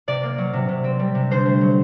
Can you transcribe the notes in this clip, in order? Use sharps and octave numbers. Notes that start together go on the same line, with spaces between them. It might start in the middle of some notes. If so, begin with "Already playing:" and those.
C3 D5
A#3
F#3
C3
C3
C4
G3
C3
D3 C5
A3
F#3